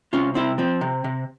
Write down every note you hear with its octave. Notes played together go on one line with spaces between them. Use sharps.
C3 C#4 F4
C3 C4 E4
F3 C4
C3
C3